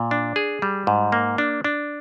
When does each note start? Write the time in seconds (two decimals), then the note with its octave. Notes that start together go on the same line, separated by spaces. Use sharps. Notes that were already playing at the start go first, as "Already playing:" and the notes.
Already playing: A#2
0.11 D4
0.36 G#4
0.62 G3
0.87 G#2
1.12 A#3
1.38 D4
1.64 D4